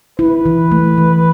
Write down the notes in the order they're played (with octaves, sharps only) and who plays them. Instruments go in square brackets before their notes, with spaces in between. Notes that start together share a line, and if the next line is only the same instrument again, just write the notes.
[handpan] E4 [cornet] B4
[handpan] E3
A3
E3